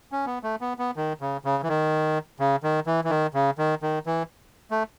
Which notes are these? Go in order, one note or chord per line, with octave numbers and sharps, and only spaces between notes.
C#4
B3
A3
B3
B3
D#3
C#3
C#3
E3
D#3
C#3
D#3
E3
E3
D#3
C#3
D#3
D#3
E3
A3